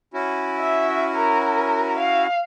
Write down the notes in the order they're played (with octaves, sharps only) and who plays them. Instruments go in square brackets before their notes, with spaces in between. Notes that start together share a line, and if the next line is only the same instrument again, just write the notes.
[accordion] C#4 E4 F#4
[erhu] E5
A#4
F5